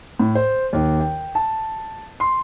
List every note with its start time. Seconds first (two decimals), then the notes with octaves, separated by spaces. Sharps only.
0.20 A2
0.35 C5
0.73 D#2
1.00 G5
1.35 A5
2.20 C6